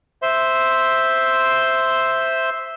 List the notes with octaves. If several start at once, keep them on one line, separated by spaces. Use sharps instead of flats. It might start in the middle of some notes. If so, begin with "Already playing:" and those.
C5 E5 C6